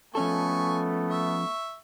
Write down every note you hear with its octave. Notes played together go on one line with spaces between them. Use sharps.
F3 A3 B3 C#4 A4 G#5 C#6
E5 C#6